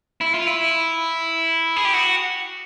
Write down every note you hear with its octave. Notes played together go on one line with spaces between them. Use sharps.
E4
F4
E4
G#4
G4
F#4